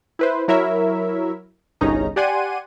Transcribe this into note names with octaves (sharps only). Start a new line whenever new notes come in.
E4 B4 C5
F#3 E4 A#4 C#5 E5
G1 C2 C#4 D#4 G#4 A#5
G4 D5 F#5 G#5 C6 D#7